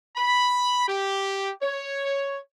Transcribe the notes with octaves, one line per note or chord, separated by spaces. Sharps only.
B5
G4
C#5